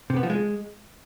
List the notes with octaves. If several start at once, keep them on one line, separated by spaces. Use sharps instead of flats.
C3
B3
F3
G#3